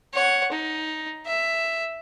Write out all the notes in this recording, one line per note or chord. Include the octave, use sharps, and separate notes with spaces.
C#5 F#5
D#4
E5